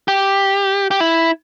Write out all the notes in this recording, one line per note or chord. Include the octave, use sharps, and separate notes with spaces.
G4
G4
E4